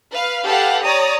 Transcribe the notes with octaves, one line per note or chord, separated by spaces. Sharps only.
B4 F5
G4 A4 B4 F5 F#5
C#5 D5 A#5 D#6